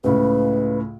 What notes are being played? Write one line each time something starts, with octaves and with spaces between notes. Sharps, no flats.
C#2 A2 C#3 B4